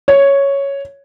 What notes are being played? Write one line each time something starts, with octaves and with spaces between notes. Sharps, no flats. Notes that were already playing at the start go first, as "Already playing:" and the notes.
C#5